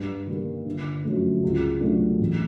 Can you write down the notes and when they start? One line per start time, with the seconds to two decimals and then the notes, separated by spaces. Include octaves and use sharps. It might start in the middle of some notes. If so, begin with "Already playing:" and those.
Already playing: G2
0.27 D#3 G3 A#3
0.66 G1
1.04 F#2 D3 F3 A3
1.43 C#2
1.81 B2 F#3 A3 D4
2.19 A1